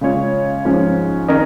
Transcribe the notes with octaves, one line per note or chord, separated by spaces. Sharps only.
C#3 G#3 F4 C#5
G#2 F3 C#4
D#3 C#4 A#4 D#5